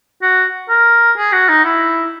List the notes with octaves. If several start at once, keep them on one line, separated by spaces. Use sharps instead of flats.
F#4
A#4
G#4
F#4
D#4
E4